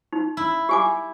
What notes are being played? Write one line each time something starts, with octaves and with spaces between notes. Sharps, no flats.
D#4
E4
G4 G#5 D6